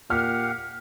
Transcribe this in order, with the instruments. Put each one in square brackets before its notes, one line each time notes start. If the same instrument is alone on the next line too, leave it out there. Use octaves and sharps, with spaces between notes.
[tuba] A#2 [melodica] G4 F5 F#5 [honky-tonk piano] F6